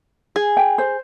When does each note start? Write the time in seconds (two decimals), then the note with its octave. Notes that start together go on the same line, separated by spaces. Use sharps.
0.36 G#4
0.57 G5
0.78 C5